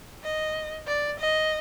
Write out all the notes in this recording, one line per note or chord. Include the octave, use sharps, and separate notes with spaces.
D#5
D5
D#5